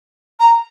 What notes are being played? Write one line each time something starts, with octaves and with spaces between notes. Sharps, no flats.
A#5